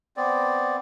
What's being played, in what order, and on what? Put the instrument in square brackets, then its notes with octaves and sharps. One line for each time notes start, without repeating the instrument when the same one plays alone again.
[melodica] B3 C4 D5